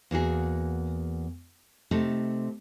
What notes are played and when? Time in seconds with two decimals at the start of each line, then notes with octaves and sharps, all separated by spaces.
0.11 E2 A#3 F#4 G#4
1.91 C3 A3 D#4 A4